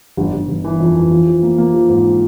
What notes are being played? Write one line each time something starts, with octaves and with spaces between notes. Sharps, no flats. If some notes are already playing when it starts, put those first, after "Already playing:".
G1
G1
G1
E3
F2
E3
F3
F3
A#3
A#3
F3
G#2